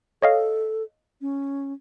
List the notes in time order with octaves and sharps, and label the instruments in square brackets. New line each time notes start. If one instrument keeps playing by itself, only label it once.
[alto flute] A4 [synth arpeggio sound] C#5 D#5 F5
[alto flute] C#4